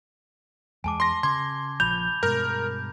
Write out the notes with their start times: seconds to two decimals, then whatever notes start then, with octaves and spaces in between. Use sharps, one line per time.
0.84 E2 G#3 G#5 A5 D6
1.00 C6 A#6
1.23 C#3 C6 D6 G#6
1.80 A#1 F3 B5 G6 F7
2.23 G2 B2 G#3 A#4 G6